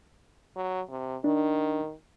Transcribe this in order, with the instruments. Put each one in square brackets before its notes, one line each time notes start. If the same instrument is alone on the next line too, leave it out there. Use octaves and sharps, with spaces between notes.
[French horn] F#3
C3
[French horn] D#3 [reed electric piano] D4